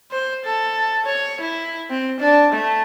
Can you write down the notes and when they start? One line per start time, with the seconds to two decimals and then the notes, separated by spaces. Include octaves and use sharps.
0.11 C5
0.45 A4
1.06 C#5
1.41 E4
1.90 C4
2.20 D4
2.52 A3